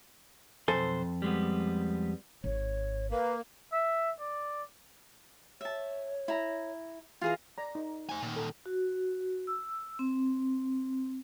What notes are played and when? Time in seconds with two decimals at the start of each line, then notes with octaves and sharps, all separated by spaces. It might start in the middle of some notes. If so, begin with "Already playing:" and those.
0.68 B1 F2 A4 C5 G#5
1.22 G3 G#3 B3
2.44 G#1 C#5
3.11 A#3 B4
3.72 E5
4.20 D5
5.61 C#5 E5 A5
6.28 E4 A#5
7.21 E3 F4 G#4 A#5
7.58 D5 A#5
7.75 D#4
8.09 C5 G#5
8.22 A#2 D#3
8.36 A4
8.66 F#4
9.47 E6
9.99 C4